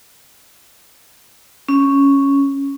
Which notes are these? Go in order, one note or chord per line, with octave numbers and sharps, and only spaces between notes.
C#4